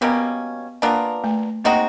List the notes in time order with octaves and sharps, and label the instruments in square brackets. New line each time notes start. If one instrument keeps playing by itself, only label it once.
[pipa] B2 G3 A#3 C#4 [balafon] B3
[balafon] A#3 [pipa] B3 D4 F4 A#4
[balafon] A3
[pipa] G#3 C4 D#4 F#4 [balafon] A#3